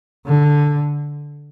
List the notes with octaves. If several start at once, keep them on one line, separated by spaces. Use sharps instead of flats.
D3